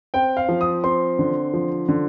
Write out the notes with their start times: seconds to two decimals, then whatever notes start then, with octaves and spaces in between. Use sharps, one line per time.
0.14 C4 G5
0.37 F5
0.49 F3
0.61 D#6
0.84 C4 C6
1.19 D3
1.54 F3
1.89 D3